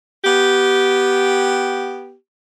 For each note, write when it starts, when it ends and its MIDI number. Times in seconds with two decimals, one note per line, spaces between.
0.24 2.13 59
0.24 2.13 67